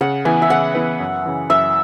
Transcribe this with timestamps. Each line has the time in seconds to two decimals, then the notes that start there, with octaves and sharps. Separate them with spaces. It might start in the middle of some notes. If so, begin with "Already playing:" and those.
0.01 C#3 F#5
0.25 E3 B3 E4 B4 G#5
0.42 E5
0.50 C#3 F#5
0.75 E3 B3 E4 B4
1.00 F#2
1.26 C#3 E3
1.49 F#2 E5